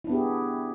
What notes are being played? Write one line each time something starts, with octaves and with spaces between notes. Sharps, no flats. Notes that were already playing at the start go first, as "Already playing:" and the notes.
B3 D4 E4 G4 G#4